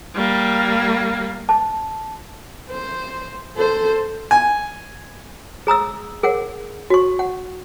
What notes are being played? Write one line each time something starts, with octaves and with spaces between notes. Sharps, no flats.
G3 A#3
A5
C5
A4 C5
G#5
G#4 A#5 D#6 E6
G#4 A#4 F#5
F#4 C#6
F#5